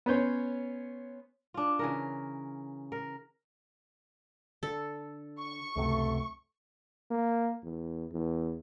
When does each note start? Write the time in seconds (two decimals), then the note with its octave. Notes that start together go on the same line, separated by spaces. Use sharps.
0.06 B3 C#4 C5 C#5
1.54 D4 F4
1.79 C#3 E3 A#4
2.92 A#4
4.63 D3 A4
5.39 C#6
5.76 C#2 F#2 C3 A3
7.11 A#3
7.64 E2
8.13 E2